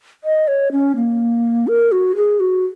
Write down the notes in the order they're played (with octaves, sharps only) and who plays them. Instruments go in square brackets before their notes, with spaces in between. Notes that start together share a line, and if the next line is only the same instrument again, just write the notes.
[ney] D#5
C#5
C#4
A#3
A#4
F#4
G#4
F#4